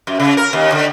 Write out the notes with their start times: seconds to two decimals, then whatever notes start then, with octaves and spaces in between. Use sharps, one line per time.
0.07 F#2
0.20 C#3
0.37 A#4
0.53 D#2
0.72 D3